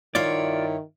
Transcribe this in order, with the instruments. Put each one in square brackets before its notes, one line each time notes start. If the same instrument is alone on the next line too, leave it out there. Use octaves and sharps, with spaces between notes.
[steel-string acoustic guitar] G2 E4 C#5 [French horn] D#3 [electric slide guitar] F4 D5